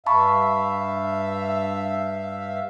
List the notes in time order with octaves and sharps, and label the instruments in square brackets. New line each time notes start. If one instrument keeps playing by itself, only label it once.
[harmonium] G2 E5 F5 [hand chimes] A5 B5 C#6